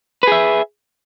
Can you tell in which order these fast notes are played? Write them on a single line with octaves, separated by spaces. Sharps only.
B4 G#4 E5